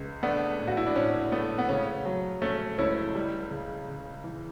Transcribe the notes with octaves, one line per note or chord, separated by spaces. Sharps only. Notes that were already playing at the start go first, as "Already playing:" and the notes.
Already playing: C#2
A3 B3 D4
A2
F#4
E4
D4
A2 C#4
A3 B3
B3
C#3 C#4
F#3
A3 C#4
C#2 C#4 E4
G3
C#3
C#3
E3